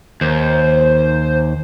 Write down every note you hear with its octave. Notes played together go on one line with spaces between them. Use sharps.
D#2 C5